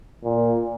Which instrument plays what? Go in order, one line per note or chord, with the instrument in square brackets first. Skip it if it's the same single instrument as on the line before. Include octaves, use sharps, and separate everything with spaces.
[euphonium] A#2